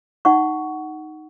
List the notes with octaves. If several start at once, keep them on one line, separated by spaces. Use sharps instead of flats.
D#4 F#5 C#6